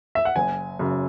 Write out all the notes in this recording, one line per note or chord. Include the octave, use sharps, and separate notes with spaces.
E5
F#5
F#1 G#5
F#2 C#3